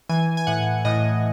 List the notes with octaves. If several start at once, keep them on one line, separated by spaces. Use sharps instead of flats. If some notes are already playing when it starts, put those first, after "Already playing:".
E3 G#5
G#5
A2 F#5
A2 D#5